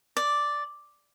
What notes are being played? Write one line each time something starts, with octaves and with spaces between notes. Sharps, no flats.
D5